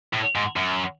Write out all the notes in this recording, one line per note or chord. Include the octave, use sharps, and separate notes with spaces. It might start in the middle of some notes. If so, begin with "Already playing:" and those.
A2
G#2
F#2